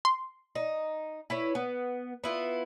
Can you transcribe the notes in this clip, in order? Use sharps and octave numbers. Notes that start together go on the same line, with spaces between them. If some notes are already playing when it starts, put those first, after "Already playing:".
C6
D#4
E4 B4 C#5
B3
B3 E4 F4